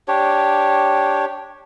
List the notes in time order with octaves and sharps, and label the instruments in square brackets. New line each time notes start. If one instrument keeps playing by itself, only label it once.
[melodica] D4 G4 C#5